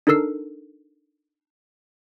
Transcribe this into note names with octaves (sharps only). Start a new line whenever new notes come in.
D4 D#4 A4 A#4 E6 C7